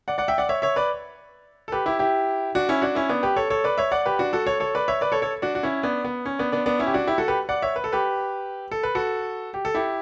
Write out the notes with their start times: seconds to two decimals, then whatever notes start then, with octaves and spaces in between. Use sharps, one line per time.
0.08 D5 F#5
0.18 D5 F#5
0.28 E5 G5
0.38 D5 F#5
0.49 C#5 E5
0.62 C#5 E5
0.76 B4 D5
1.68 A4
1.72 G4 B4
1.86 E4 G4
1.99 E4 G4
2.55 D4 F#4
2.69 C#4 E4
2.82 D4 F#4
2.95 C#4 E4
3.09 B3 D4
3.23 G4 B4
3.36 A4 C#5
3.50 A4 C#5
3.64 B4 D5
3.78 C#5 E5
3.91 D5 F#5
4.06 G4 B4
4.19 D4 F#4
4.33 F#4 A4
4.46 A4 C#5
4.60 A4 C#5
4.75 B4 D5
4.88 C#5 E5
5.01 B4 D5
5.12 A4 C#5
5.22 A4 C#5
5.42 D4 F#4
5.55 F#4
5.63 C#4 E4
5.83 B3 D4
6.04 B3
6.25 C#4
6.39 B3 D4
6.52 B3 D4
6.66 B3 D4
6.79 C#4 E4
6.87 G4
6.94 D4 F#4
7.07 E4 G4
7.18 F#4 A4
7.28 G4 B4
7.49 D5 F#5
7.62 C#5 E5
7.76 B4
7.84 A4
7.92 G4 B4
8.71 A4
8.83 B4
8.95 F#4 A4
9.54 G4
9.65 A4
9.75 E4 G4